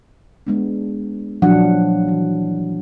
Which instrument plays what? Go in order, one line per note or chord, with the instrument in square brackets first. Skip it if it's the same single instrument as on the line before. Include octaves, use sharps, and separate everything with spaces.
[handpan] G#3 B3 D4
A#2 F3 F#3 D4 F#5
E3